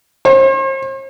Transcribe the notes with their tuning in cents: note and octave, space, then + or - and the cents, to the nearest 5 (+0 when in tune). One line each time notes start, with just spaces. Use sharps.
C5 +45